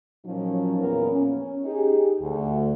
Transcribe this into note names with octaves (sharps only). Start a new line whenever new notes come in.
A#2 F3 F#3 C#4 D#4
E2 A#2 B3 A#4
C#4
D#4 G4 G#4
D2